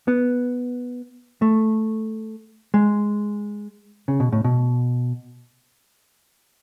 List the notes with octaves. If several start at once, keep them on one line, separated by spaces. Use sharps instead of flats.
B3
A3
G#3
C#3
B2
A2
B2